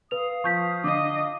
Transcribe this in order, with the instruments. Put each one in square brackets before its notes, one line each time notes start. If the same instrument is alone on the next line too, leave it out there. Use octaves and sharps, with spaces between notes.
[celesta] B4 F7 [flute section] F5 D#6
[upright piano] F3 [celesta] C#6 G6 B6
[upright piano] D3 [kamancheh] D#5 [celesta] D6